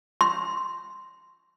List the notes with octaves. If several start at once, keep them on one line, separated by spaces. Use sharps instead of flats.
C6